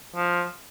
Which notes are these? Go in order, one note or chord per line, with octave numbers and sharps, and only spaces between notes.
F3